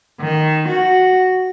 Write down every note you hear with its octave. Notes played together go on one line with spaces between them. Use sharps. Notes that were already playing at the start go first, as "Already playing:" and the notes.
D#3
F#4